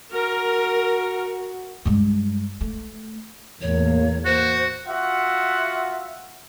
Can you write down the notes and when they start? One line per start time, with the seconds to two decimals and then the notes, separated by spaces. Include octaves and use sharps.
0.13 F#4 A#4
1.85 G2 G#3
2.61 A3
3.61 E2 A2 A#3 C#5
4.25 F#4 C5
4.87 F4 F#4 E5 F#5